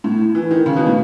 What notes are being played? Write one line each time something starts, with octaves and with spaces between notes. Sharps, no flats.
A2
E3
D#3
C#3
B2
A2